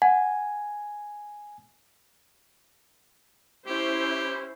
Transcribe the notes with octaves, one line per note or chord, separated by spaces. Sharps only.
F#5 G#5
C#4 E4 G4 C5